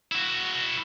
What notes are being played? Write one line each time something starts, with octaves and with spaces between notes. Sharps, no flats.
E4 F#4